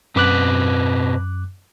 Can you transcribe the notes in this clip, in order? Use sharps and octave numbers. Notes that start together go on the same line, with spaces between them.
F#2 B2 C4 B4 D6 F#6